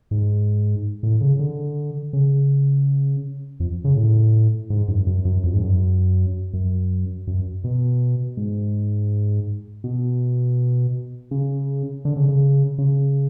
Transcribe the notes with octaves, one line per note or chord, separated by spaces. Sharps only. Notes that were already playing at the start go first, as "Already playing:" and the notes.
G#2
A2
C#3
D3
C#3
F2
C#3
A2
G#2
F#2
F#2
F#2
F2
G#2
F#2
F#2
F#2
B2
G#2
B2
C#3
D3
C#3
C#3
C#3